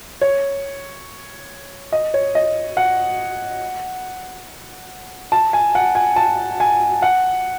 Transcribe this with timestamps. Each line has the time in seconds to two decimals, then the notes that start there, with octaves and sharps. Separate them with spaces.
0.21 C#5
1.92 D#5
2.14 C#5
2.35 D#5
2.77 F#5
5.32 A5
5.53 G#5
5.75 F#5
5.95 G#5
6.16 A5
6.60 G#5
7.02 F#5